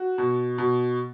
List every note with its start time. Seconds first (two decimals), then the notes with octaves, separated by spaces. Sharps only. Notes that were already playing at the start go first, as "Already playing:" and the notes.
Already playing: F#4
0.18 B2
0.58 B2